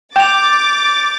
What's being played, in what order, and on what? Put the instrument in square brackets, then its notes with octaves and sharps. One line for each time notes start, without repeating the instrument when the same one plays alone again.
[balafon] G5 [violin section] D6 A6 [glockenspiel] G6 F7